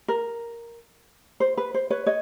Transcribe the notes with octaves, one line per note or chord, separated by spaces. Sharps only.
A#4
C5
B4
C5
B4 C#5
C#5 D#5